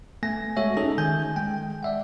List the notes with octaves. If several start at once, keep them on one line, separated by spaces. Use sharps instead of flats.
A3 B3 G#5 A#6
G#3 F#4 A4 C#5 E5
C#4 D#4 G#4 A4
D#3 G#5 G6
G#3 G5
D5 E5 F#5